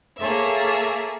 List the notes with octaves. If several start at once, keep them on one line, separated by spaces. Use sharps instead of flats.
A#3 G#4 A4 C#5 E5